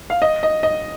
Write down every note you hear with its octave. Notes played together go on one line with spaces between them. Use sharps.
F5
D#5
D#5
D#5